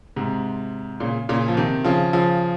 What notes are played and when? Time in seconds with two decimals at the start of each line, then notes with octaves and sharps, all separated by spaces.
0.16 G#2 C3
1.00 A#2 C#3
1.29 A#2 C#3
1.48 F3
1.57 C3 D#3
1.84 C#3 F3
2.13 C#3 F3